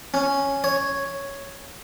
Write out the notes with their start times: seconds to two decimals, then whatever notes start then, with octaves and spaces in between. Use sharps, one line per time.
0.14 C#4
0.64 C#5